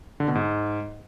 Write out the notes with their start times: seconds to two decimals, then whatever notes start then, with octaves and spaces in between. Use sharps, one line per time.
0.20 D3
0.28 B2
0.35 G#2